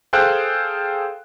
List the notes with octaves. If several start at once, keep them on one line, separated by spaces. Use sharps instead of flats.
G#4 A4 C5 F5 G5 F#6